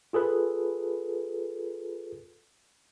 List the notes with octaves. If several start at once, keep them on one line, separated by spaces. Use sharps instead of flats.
F4 G#4 A4 B4